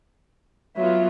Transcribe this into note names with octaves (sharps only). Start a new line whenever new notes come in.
F#3 B3 F4 E5